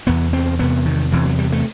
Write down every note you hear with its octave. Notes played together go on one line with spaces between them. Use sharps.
E2 C3 B3
C4
E2 C3 B3
D#3
E2 C3 E3
F#3
G3
A3